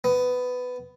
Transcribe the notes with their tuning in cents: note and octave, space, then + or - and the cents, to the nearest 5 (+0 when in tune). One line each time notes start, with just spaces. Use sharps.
B3 +15